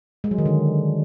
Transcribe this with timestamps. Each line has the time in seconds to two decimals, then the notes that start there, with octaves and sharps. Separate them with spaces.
0.24 G#3
0.31 F#3
0.38 D#3
0.45 D3